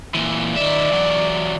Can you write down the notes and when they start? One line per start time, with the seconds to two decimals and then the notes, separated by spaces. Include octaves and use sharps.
0.14 A#2 E3
0.57 D#3 D5 E5
0.92 E3 F#3